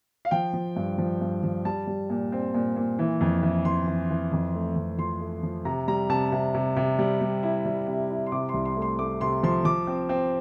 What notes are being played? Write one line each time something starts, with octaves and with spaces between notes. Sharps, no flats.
F5
F3 G5
F3
G2
F3
G2
F3
G3 A5
G3
A#2
C4
A#2
A#2
E3
F2
E3
E3 C6
E3
E3
F2
A3
F2
F3 C6
A3
F3
C3 A#5
G3 A#5
C3 A5
C3
C3
C3
G3
G3
E4
G3
C3
E4
C6
C3 D6
C2 C6
C6
A3
C6
A3 D6
C3 C6
F3 C6
F3 D6
C4
C4